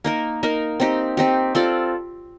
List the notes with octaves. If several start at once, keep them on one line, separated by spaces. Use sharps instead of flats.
A#3 D#4 A#4
A#3 D#4 A#4
C4 D#4 G4
C4 D#4 G4
C4 F4 A4 D5